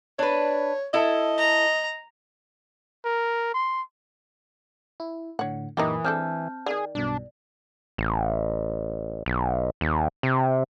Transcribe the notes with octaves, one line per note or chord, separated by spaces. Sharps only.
D4 B4 C#5
E4 A4 D#5
A#5
A#4
C6
E4
A2 D3 C#5 F#5
F#2 A#2 E3 D#4 E4 G4 A#4 D#6
G#3 C4 D4 A4 A5 F6 G6
D3 D#3 G#4 D5
B1 G2 B2 D4
A1
B1
D#2
C3